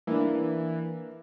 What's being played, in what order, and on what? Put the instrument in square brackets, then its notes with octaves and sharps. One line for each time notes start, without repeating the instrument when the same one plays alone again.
[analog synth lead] E3 [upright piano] A#3 D4